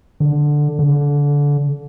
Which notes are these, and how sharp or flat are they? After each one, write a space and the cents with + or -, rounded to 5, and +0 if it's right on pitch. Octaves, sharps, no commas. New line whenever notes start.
D3 +5
D3 -25